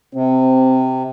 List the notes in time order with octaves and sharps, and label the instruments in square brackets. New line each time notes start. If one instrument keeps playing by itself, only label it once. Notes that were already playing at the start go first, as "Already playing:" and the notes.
[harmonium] C3 [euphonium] C4